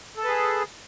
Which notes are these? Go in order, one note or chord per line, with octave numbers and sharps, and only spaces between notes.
G#4 A4 B4 A5